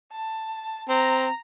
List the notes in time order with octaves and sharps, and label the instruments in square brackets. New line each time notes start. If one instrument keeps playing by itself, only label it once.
[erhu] A5
[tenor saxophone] C4 [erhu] A#5